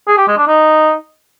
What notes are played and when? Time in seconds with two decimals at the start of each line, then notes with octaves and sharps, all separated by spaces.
0.07 G#4
0.17 G4
0.27 G#3
0.37 D4
0.47 D#4